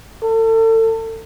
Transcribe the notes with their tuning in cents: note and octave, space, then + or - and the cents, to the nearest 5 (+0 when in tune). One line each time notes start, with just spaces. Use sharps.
A4 +35